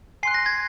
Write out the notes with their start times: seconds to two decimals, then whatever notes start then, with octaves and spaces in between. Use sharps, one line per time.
0.23 G#5 C6 F#6 C7
0.34 A#6
0.46 G#6